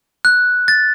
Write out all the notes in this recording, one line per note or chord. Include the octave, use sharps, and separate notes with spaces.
F#6
A6